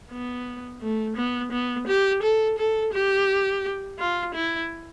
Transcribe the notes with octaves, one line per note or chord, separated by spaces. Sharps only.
B3
A3
B3
B3
G4
A4
A4
G4
F4
E4